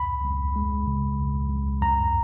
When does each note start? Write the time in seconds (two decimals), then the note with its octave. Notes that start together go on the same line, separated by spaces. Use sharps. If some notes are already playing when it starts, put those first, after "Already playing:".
Already playing: C#2 B5
0.24 C#2
0.56 G#3
0.87 C#3
1.19 C#2
1.50 C#2
1.82 F#2 A#5